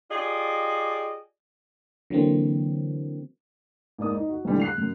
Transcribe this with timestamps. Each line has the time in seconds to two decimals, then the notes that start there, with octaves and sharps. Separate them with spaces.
0.10 F4 G4 G#4 D5 D#5
2.10 D3 E3 F#3 A#3 C4
3.99 G#2 A#3 D5 D#6
4.14 D#4
4.29 F#4
4.45 B1 A2 D3 G3 G#3
4.60 F#6 C7 F7
4.78 F#2